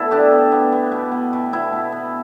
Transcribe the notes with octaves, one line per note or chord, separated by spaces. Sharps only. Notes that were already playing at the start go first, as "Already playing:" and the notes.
Already playing: B2 E4 A4
B3 D4 G4
B3
B3
B3
B2
B3
B2
B3 E4
B2
B3